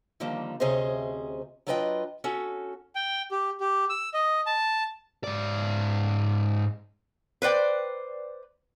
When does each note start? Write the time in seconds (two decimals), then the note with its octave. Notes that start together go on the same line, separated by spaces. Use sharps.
0.20 D3 D#3 F3 G3 A#3
0.60 D2 C3 C#4 G#4 C5 D#5
1.67 F#3 D4 F4 B4 D#5 G5
2.24 C#4 F#4 A4
2.95 G5
3.31 G4
3.60 G4
3.90 E6
4.14 D#5
4.46 A5
5.24 G#2 D5
7.42 B4 C5 D5 G5